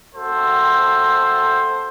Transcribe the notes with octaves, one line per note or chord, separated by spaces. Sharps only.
A3 C4 F#4 A4 C5